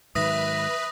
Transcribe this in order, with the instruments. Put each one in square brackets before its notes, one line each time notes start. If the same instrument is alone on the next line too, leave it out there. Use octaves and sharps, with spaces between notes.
[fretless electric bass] G#2 D#3 F#3 [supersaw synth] B4 [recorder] E5 [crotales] D#6 A#6